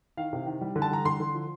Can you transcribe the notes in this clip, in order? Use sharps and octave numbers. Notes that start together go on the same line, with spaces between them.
D#3 F5
C3
D#3
G3
D3
A5
G3 A#5
D3 C6
D3
F3